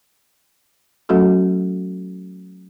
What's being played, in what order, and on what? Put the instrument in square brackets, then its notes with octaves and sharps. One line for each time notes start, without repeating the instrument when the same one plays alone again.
[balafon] F#3 A3 C#4 F#4 A4